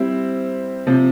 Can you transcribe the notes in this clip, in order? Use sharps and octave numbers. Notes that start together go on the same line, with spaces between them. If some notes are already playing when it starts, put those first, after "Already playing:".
Already playing: G3 C4 E4
C3 F3